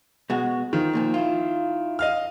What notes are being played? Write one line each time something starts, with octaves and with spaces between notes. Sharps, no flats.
B2 G#3 F#4
D#3 F3
D#2 A#2 F3
E4 F4
D#5 F5 F6